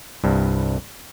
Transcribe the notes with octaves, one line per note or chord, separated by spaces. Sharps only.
C2 G2